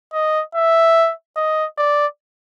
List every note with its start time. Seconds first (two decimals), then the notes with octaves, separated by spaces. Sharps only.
0.13 D#5
0.55 E5
1.37 D#5
1.78 D5